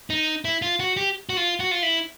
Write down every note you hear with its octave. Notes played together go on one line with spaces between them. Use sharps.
D#4
E4
F4
F#4
G4
F#4
F4
F#4
F4
E4